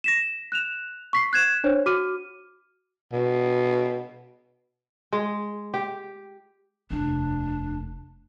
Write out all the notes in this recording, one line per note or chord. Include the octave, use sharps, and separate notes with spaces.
A#6 B6 E7
F#6 E7 F7
C#6 B6 C7
F#6 G#6 E7
D4 C5 C#5
F#4 D6 F6 D#7
B2
G#3
G4
F1 D#2 D4